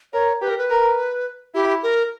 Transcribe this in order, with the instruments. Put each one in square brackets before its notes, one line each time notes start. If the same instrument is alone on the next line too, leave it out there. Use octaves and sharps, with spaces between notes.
[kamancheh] A#4 [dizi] C#5
[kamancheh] G4 [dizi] B4
[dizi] A#4
B4
[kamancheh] A#4
[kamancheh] E4 [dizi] G4
[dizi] A#4